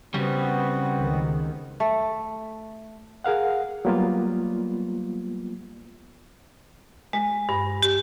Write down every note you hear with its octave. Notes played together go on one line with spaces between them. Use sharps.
C#3 G3 B3 C4 F#4
C#2 D#3
A3
G#4 A#4 F5 F#5
F#3 G3 A#3 B3 F4
G#3
G2
G4